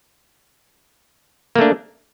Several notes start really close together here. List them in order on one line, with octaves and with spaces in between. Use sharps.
A#3 A3 D4